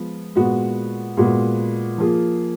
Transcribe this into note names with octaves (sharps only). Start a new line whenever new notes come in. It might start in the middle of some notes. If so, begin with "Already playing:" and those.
Already playing: F3 G#3 B3 F4
A#2 G#3 B3 F#4
A#2 G#3 B3 F#4
F3 A#3 F4 G#4